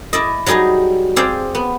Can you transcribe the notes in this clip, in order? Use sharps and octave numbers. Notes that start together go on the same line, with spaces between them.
E4 D5 D#5
F#3 G3 D#4 G#4 D#5
C4 G4 G#4 D5 F5
B3